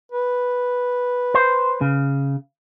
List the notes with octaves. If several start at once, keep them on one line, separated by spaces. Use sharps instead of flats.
B4
C5
C#3